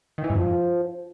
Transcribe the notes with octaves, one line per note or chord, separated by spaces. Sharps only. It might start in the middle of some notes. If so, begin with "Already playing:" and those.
D#3
E3
G2
F3